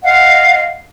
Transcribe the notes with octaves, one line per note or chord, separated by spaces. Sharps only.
D#5 F5 F#5